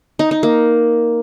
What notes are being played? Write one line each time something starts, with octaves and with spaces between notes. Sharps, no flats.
D#4
D#4
A#3